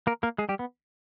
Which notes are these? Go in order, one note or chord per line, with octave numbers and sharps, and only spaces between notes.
A#3 A#4
A#3 A#4
G#3 G#4
G3 G4
B3